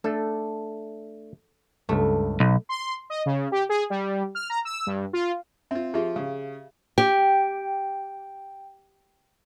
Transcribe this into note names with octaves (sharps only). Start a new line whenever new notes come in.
A3 D4 A4
C#2 G2 A3
B1
C6
D#5
C#3
G4
G#4
G3
F6
A#5
E6
G2
F4
C4 F4 E5
F3 F4 G4 G#4 E5
C#3 F5
G4 G5